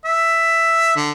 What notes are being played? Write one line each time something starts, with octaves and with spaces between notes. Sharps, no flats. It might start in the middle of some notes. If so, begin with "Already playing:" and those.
E5
D3